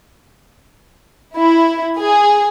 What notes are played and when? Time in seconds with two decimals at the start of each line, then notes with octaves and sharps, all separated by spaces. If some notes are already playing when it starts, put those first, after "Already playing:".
1.37 E4
1.99 G#4